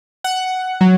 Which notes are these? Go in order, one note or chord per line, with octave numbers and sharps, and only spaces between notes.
F#5
F#3